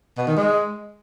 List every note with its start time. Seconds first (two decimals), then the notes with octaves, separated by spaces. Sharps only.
0.18 B2
0.27 D#3
0.37 G#3